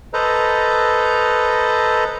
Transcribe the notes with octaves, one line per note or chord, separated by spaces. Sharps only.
A4 B4 C5 D#5 A#5